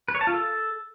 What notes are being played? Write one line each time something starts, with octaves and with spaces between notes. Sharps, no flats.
B4
C#5
A5
F4
A4